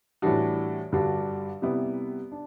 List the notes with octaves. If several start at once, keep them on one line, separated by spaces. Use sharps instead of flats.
A2 E3 G3 D4 F#4
G2 D3 G3 D4 F#4
C3 G3 B3 E4
D4